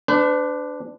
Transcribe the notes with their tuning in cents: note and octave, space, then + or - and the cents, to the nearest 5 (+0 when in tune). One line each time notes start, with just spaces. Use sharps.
D4 +0 B4 +45